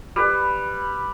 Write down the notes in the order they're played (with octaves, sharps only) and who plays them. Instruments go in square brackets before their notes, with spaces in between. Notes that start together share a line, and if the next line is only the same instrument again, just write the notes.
[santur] G3 B4